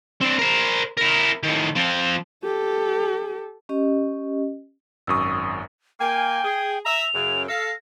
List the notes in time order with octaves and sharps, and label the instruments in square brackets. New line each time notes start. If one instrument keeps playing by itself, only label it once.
[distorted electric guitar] C4 D4
A#4 C5
E4 A#4
A2 D#3
F3 C4
[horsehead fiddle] G4 A4
[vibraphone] C#4 G4 D#5
[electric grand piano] G#1 F#2 D#6 [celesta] C#6 E6
[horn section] A#3 G#5 [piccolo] G5
[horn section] G#4
[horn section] E5 A#5 [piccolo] F7
[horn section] F#2 C#3
[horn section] A4 F5 [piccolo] A#6